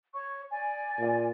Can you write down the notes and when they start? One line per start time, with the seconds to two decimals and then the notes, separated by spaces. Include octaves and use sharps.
0.13 C#5 C#6
0.51 D5 G#5
0.99 A#2